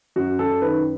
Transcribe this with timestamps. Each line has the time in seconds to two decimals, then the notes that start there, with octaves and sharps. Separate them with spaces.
0.16 F#2 F#4
0.39 F#2 A4
0.62 D#3 B4